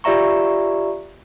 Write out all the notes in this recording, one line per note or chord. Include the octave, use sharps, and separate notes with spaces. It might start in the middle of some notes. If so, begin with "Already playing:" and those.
F4 G4 D5 E5 A#5 C#6